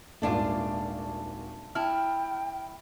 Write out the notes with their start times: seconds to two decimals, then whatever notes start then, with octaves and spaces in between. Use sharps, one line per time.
0.22 D#1 G#1 A3 D4 F4
1.75 E4 G5 A5 F6